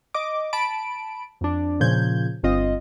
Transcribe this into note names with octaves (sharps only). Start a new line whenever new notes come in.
D#5 D6
A5 B5 D7
F2 D4
A#2 C#3 F3 G6 G#6
G1 C4 F4 D#5